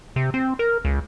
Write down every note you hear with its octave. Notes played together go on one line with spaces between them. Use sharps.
C3
C4
A#4
C#2